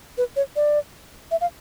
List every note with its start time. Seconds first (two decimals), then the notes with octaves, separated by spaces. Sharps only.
0.18 B4
0.36 C#5
0.56 D5
1.31 E5
1.41 F5